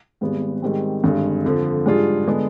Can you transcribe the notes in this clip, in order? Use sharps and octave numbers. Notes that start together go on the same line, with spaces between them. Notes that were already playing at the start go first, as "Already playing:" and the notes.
G#1 G#2 G3 B3
G#2 D#3 G3 C4
G#1 G2 D3 G#3
F2 D3 F3
G#2 G3 D4 F4 G#4
D3 G#3 B3 D4